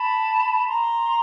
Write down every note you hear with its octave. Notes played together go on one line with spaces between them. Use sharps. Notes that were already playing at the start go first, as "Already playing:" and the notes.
Already playing: A5 B5
A#5 C6